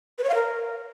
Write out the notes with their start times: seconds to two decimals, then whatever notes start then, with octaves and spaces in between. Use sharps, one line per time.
0.18 B4
0.24 C#5
0.29 F5
0.35 A#4